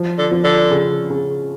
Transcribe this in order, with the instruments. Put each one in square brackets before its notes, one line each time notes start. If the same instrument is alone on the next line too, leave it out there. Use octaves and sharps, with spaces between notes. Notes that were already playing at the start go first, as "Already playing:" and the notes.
Already playing: [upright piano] F3
[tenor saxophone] D3
[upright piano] F3
[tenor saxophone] D3
[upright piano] C#3
C#3